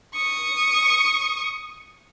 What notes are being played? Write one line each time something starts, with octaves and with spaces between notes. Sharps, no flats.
C#6 D#6